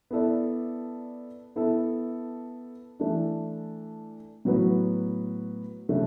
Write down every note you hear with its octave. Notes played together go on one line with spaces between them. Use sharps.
B3 E4 A4 D5
B3 E4 A4
E3 A3 D4
A2 F#3 B3 F#4 B4
C#3 F#3 A3 D4